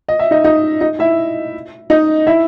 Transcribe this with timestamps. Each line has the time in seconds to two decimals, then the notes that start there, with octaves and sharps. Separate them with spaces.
0.08 D#5
0.19 E5
0.31 D#4 D#5
0.44 D#4 D#5
0.81 D#4 D#5
0.99 E4 E5
1.90 D#4 D#5
2.27 E4 E5